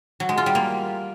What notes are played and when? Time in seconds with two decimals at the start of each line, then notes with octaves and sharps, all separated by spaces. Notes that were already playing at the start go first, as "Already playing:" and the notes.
0.20 F#3
0.29 G#3
0.38 F4
0.46 G3
0.55 A#3